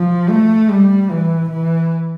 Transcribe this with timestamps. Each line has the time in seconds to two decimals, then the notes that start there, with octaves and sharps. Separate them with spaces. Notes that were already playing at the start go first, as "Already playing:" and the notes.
Already playing: F3
0.30 A3
0.70 G3
1.10 E3
1.50 E3